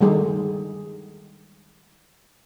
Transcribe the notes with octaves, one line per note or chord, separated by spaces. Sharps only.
D3 D#3 G3 G#3 G#4 A4